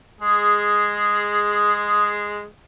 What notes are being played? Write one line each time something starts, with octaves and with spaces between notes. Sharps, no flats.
G#3 G#4